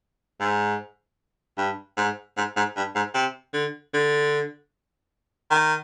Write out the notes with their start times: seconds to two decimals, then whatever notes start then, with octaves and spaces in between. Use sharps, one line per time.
0.40 G#2
1.58 G2
1.97 G#2
2.37 G#2
2.56 G#2
2.76 G2
2.96 G#2
3.14 C3
3.53 D3
3.94 D3
5.51 D#3